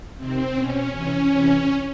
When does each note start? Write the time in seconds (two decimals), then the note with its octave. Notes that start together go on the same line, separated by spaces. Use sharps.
0.17 C3 D#3 C4
0.54 B2 C#4
0.92 C3 E3 C#4
1.32 C3 E3